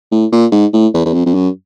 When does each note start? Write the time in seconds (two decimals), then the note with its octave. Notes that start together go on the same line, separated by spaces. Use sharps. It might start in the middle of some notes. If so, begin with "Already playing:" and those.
0.12 A2
0.32 A#2
0.52 G#2
0.73 A2
0.94 E2
1.06 E2
1.13 F2
1.26 F2
1.34 F#2